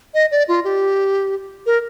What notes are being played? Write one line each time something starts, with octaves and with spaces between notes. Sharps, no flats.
D#5
D5
F4
G4
A#4